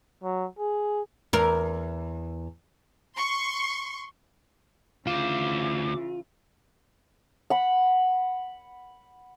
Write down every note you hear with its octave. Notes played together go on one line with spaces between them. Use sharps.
F#3
G#4
E2 A#4
C6 C#6
D2 C#3 E3 F4 C5 D6
F#5 B5